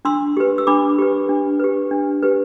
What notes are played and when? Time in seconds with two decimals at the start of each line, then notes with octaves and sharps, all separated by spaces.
0.05 D4 C6 E6
0.37 G4 B4
0.58 E6
0.67 D4 B5 D6
0.98 G4 B4
1.29 D4
1.59 G4 B4
1.91 D4
2.23 G4 B4